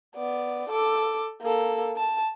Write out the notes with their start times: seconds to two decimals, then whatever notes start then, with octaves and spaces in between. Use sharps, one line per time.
0.15 B3 D5
0.70 A4 D6
1.42 A#3 A4
1.96 A5